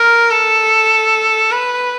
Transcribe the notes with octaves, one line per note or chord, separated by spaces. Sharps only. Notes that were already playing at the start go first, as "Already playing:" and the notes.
Already playing: A#4
A4
B4